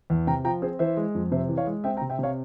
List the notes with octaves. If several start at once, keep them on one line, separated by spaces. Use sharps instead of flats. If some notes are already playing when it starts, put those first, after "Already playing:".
E2
C3 G5 A#5
F3 G5 A#5
C4 G#4 C5
E3 C5 E5
G#3
F2
C3 C5 E5
E3
C#5 F5
G#3
C4 E5 G5
G5 A#5
C3
E5 G5
C3 C#5 F5